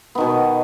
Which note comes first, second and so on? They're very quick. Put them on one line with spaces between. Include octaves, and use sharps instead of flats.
B3 D#3 B2